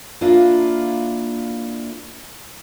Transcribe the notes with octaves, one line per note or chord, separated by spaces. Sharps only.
A#3 D4 E4 F4